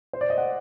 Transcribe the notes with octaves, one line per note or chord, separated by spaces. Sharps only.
C5
D5
D#5
F#5